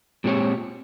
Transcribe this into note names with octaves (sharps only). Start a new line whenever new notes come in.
A#2 G#3 C4 G4 C#5